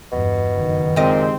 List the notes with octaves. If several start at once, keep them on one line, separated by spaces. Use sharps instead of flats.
E2 G2 B2
F#1 D#3
A#2 G#3 C4 G4 D#5